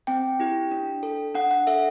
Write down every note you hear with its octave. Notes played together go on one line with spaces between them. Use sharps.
C4 G5
E4 G4
D4
A4
D4 F#5
F#5
A4 E5